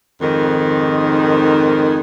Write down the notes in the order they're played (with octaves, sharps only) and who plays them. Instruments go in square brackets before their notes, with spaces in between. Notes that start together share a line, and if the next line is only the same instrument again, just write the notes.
[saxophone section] F2 G#2 D#3